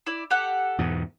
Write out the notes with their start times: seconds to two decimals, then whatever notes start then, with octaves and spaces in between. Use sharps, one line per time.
0.06 E4 D5
0.30 G4 A4 F#5
0.78 E2 G#2 B2